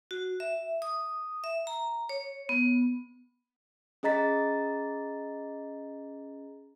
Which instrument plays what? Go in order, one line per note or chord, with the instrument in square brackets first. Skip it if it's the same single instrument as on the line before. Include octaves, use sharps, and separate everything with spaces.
[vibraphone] F#4
E5
D#6
E5
A#5
C#5
B3
[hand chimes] C#4 G#4 D#5 A#5 A6 B6